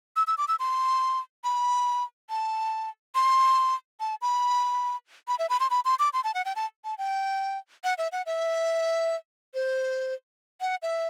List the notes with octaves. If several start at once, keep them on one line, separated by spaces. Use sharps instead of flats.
E6
E6
D6
E6
C6
B5
A5
C6
A5
B5
B5
E5
B5
C6
B5
C6
D6
C6
A5
F#5
G5
A5
A5
G5
F#5
E5
F#5
E5
C5
F#5
E5